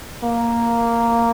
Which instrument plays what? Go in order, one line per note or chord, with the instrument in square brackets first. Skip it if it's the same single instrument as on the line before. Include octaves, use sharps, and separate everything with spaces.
[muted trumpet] A#3